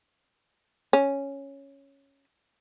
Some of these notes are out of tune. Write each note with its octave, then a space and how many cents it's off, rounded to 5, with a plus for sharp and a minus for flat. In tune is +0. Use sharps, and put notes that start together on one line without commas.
C#4 +0